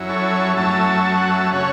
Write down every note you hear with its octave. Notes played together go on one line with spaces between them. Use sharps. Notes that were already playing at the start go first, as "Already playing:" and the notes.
Already playing: F#2 F#3 C#4 E4
A4 C#5
F#2 F#3 A3 C#4 E5 A5
A5
F#5
E5 A5
C#3 A3 C#4 C#5 F#5